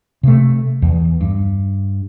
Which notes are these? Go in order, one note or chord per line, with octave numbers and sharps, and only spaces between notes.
C3 A3
E2
G2